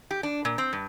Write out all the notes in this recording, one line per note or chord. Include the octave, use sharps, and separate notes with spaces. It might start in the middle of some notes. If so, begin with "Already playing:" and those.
G4
D4
A#2
C4
G2